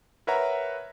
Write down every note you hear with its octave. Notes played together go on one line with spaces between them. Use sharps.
A#4 B4 C#5 E5 F#5 A#5